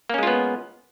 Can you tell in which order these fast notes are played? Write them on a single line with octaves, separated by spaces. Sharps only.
A#3 C#4 G#3 F4 B3